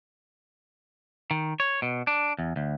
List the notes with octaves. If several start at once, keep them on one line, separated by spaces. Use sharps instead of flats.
D#3
C#5
B2
D4
E2
D2